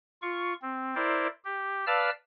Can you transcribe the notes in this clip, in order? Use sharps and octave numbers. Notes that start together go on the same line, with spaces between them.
F4 C#6
C4
E4 A#4 C5 D5
G4
B4 D5 F5 A5 E6 F6